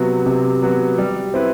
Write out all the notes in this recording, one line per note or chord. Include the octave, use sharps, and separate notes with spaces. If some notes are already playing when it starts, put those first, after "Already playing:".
Already playing: C3 F#3 B3 F#4
C3
F#3 B3 F#4
G3
C4 E4 B4